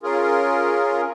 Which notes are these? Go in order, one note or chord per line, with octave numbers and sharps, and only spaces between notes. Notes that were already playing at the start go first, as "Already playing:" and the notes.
C#4 F4 G#4 A#4